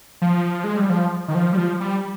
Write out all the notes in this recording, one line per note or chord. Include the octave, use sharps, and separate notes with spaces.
F3
G#3
G3
F3
D#3
F3
G3
F3
G3